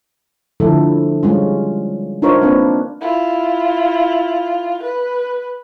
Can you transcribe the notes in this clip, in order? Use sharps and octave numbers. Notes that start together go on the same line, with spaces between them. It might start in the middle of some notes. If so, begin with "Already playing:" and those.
D3 F3 A3 E4 A4
G3 G#3 C#4 F4
D4 D#4 F4 A#4 C5 C#5
A#3 C4 D4 B4
E4 F4
B4